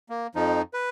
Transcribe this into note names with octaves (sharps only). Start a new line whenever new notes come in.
A#3
F2 F3 D#4
B4